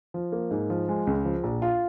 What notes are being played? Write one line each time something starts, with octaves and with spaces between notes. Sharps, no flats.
F3
A#3
G#2
F3
G#3
C#2
F3
A#1
F4